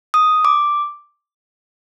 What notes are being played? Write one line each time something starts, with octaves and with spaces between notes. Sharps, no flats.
D#6
D6